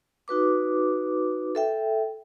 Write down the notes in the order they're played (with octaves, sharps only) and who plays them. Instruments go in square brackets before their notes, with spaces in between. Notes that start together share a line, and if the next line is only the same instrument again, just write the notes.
[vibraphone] D#4 F#4 B4 D6
A4 E5 G5